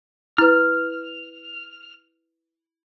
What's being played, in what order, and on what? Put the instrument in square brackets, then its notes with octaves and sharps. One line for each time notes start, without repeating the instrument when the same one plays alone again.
[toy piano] E4 B4 [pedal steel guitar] F6